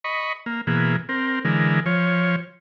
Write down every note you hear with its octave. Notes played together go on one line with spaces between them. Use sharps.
D#5 B5 C#6
A#3
B2 E3 A#3 G#4
C4 A#4
D3 E3 G#3 A#4
F3 C#5